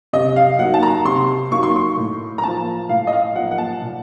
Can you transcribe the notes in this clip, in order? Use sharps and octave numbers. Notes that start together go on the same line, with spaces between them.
C3 D#5
F5
F#3 A#3 D#4 F#5
A5
A#5
C3 C6
F#3 A#3 D#4 C#6
C6
C#6
A2
A#5
F3 A#3 A5
A2 F5
D#5
F5
F3 A#3 F#5
F#5
A5
A#2